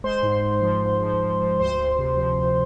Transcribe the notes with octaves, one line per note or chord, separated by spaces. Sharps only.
G#3 C5 C6
G#2
G#2
F3
G#2
F3
F3
F3
D2 C5 C6
D2
C3
F3
D2